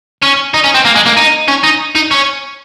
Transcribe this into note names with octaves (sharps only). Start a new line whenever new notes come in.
C#4
D#4
C#4
C4
A#3
G#3
A#3
D#4
C#4
D#4
D#4
C#4